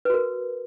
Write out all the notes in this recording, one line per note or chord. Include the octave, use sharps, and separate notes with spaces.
F#4 A#4 B4